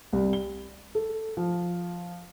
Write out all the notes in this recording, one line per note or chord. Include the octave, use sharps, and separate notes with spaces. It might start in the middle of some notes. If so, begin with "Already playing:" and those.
C2
G7
A4
F3